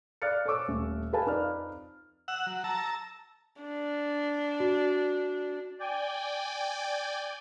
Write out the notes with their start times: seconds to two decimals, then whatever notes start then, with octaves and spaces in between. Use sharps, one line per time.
0.22 D5 F5 F6 F#6 A6 C#7
0.45 A4 C5 C#5 C#6 D6 E6
0.68 D#1 A3
1.13 G4 A4 B4 F5 G#5 A5
1.26 F2 D#4 B4 D5 F5 F6
2.28 F#5 E6
2.47 F#3
2.64 A5 A#5 E6
3.62 D4
4.60 F#4
5.78 D5 G5 G#5